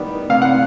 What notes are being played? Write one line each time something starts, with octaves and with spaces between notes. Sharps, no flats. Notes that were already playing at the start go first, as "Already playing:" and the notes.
Already playing: D#3 G3 B3
C3 F5
F#5